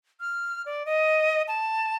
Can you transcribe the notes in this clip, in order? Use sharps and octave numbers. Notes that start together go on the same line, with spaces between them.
F6
D5
D#5
A5